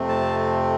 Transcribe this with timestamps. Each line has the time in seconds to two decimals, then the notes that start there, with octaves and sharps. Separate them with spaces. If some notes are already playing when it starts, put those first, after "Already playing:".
Already playing: F2 C3 A3 C4
0.08 A5